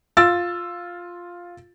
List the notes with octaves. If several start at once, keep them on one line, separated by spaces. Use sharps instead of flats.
F4 E6 A6